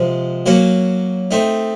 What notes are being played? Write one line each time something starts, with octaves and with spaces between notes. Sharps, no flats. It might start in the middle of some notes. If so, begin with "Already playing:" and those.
Already playing: C3 F3 G#3
F#3 A#3 C#4 F#4
A3 C4 D#4